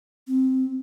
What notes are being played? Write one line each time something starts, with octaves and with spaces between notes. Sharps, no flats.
C4